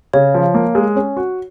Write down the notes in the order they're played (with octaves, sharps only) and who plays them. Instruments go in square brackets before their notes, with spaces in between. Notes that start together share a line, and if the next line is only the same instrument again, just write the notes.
[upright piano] C#3 [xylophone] C#5
[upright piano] F3
A#3
G#3
C#4
F#4